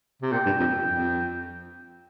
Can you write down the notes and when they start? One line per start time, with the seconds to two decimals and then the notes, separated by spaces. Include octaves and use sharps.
0.22 C3
0.33 A#2 G5
0.46 G2
0.60 F2
0.88 F2